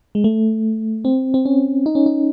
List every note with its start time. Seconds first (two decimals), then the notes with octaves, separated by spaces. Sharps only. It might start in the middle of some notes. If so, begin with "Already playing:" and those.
0.15 G#3
0.24 A3
1.05 C4
1.34 C4
1.45 C#4
1.86 D#4
1.95 C#4
2.06 D#4